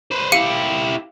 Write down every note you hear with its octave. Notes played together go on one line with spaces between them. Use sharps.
B4 C5
E4 G4 F5 C#7 D#7